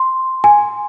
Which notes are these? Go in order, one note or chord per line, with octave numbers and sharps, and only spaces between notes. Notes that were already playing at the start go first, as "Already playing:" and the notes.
Already playing: C6
G#5